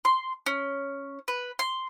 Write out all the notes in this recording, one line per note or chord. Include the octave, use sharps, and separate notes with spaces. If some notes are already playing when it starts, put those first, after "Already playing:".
C6
C#4
B4
C6